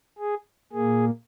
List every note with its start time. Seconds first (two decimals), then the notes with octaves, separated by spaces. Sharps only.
0.18 G#4
0.72 A#2 A#3 G#4